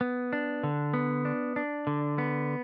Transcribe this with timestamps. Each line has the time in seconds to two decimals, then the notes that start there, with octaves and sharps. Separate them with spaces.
0.01 B3
0.33 D4
0.63 D3
0.94 B3
1.25 D4
1.56 D4
1.87 D3
2.18 B3